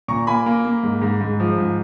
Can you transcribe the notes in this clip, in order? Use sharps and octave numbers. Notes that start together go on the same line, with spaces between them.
A#2 A#5 C#6
A#3 G#5 B5
A#3
A#3
G#2
G#2
G#2
F3
G#2